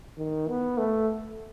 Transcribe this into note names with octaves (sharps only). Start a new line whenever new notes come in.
D#3
B3
A3